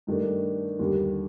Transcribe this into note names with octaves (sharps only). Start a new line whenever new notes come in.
G2 D#3 A3 D4
D#2 D3 G3